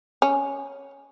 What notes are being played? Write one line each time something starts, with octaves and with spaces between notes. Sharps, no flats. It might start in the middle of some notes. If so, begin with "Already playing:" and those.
C#4